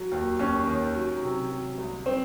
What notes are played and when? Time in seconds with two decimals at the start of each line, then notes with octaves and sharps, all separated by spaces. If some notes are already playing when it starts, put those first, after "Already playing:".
Already playing: F#3
0.11 D#2
0.39 D#2 C#4
0.67 D#3
0.94 F#3
1.23 C3
1.50 F#3
1.78 C2
2.06 C4